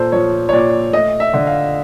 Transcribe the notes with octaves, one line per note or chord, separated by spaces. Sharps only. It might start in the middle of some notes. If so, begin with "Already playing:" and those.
Already playing: A#2 A4 C5
F3 C#5
C#5
A#2 D5
A3 D#5
E5
D3
F5